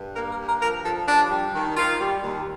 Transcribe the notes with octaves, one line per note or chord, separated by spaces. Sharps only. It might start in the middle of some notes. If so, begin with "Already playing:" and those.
Already playing: G2
A#3 A#4
A#4
G2
A#4
F3 A#4
F3 A4
D#2 D4
G3
D#3
D#3 F4
G3
D#2